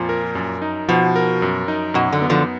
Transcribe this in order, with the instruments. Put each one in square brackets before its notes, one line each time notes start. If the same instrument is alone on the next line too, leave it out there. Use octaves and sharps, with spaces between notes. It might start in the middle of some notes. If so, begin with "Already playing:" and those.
Already playing: [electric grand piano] F2 F3 [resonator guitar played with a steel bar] A#2
[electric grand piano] A#4
F#2
D#4
[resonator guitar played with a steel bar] B2 [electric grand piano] F3
[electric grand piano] A#4
F#2
D#4
[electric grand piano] F#2 [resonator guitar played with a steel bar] B2
[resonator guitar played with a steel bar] D3
[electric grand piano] B3
[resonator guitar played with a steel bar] D3 F3